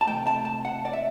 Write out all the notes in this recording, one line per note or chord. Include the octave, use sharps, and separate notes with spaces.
A5
C3 F#3 A3 G5
A5
A5
F#5
D5
E5